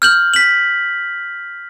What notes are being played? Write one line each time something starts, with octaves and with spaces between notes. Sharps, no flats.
F6 G6 F#7
B6 F#7